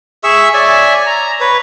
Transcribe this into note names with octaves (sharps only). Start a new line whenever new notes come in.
G#4 E5 C#6 E6
C#5 D5 E5 G#5
A#5
B4 C#5